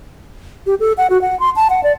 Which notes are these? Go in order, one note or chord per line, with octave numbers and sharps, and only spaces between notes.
G4
A4
F#5
F#4
F#5
C6
A5
F#5
D5